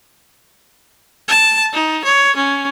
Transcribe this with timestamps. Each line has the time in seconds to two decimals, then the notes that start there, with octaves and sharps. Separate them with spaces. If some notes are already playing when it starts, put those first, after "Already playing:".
1.28 A5
1.73 D#4
2.05 C#5
2.36 C#4